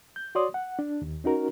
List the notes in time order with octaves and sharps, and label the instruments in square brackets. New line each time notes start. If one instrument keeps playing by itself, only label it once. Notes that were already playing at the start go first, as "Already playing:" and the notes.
[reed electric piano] G6
F#4 C#5 D5 C6 D#6
F#5
D4
D#2
C#4 D#4 F#4 A#4